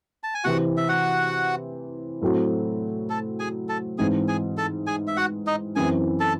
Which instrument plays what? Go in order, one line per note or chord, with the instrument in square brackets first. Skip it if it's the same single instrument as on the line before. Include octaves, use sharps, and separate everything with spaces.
[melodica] A5
G#5
[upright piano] C3 E3 C4 [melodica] F#4 F#5
[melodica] E5
F#4 F#5
[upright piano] A2 F#3 A3 C4 F#4
[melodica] A4 A5
G#4 G#5
A4 A5
[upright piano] G#2 E3 C4 [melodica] G#4 G#5
[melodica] G#4 G#5
A4 A5
G#4 G#5
E5
F#4 F#5
D#4 D#5
[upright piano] F#2 E3 C4 [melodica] G#4 G#5
[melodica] A4 A5